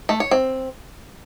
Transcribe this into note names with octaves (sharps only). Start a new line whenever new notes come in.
A3
C#5
C4